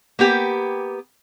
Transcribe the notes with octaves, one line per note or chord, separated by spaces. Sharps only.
A#3 B3 G4